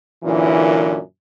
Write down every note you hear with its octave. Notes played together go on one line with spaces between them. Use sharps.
F#2 A#2 D3 E3